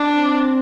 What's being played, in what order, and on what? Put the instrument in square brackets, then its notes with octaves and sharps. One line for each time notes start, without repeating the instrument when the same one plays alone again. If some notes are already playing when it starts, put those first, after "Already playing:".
Already playing: [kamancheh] D4
[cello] C4